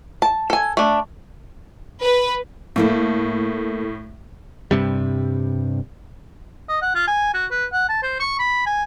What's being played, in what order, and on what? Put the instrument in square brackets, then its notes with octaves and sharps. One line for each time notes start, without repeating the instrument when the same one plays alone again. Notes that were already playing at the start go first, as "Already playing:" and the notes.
[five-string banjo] A5
A4 G#5
A3 D4
[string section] B4
[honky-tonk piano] A2 [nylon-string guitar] A3 A#3 E4
[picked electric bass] G2 C3 G3
[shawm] D#5
F#5
F4
G#5
F#4
B4
F#5
A5
C5
C#6
B5
G#5